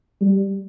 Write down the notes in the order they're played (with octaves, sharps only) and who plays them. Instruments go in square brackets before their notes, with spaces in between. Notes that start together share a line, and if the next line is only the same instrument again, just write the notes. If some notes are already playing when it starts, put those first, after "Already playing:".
[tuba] G3